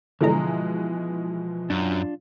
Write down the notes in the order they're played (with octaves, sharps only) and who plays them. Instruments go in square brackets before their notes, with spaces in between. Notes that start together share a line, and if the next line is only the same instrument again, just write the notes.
[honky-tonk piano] B2 E3 G#3 [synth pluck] D3 A#5 [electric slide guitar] F3
[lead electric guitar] F#2 [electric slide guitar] D4 F4